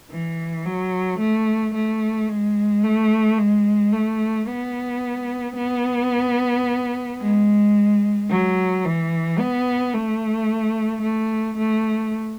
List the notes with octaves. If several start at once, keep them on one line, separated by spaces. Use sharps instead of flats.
E3
F#3
A3
A3
G#3
A3
G#3
A3
B3
B3
G#3
F#3
E3
B3
A3
A3
A3